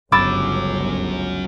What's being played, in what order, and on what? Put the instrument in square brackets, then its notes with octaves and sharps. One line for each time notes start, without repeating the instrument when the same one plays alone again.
[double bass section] G1 C#2 [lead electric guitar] F#3 C#4 [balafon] B5 [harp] D6 E6 A6